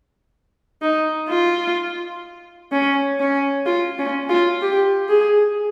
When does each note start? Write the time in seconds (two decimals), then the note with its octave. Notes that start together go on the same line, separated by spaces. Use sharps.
0.82 D#4
1.29 F4
2.72 C#4
3.20 C#4
3.66 F4
3.99 C#4
4.29 F4
4.62 G4
5.09 G#4